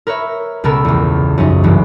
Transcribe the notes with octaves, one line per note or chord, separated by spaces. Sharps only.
A#4 B4 C#5 E5
C#2 B2 B3 A4 A#4 E6
A#1 E2
F#2 F3 D#4
C2 G2 C3 E3